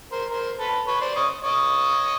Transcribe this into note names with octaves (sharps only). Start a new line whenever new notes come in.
A#4 C5
A#4 C5
A4 B4
B4 C#5
C5 D5
C#5 D#5
C#5 D#5